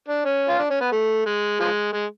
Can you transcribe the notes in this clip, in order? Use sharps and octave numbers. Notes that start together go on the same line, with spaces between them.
D4
C#4
F4
D4
C#4
B3
A3
G#3
F3 G#3
G#3